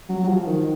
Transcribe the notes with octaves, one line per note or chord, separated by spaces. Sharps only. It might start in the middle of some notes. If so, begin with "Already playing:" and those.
F#3
F#3
F3
D#3